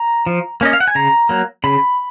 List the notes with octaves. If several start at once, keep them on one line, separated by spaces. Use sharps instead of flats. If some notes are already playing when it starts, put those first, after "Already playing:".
Already playing: A#5
F3
A#3 C#4 D#5
F5
F#5
G#5
C#3 A#5
F#3 A#3
C#3 B5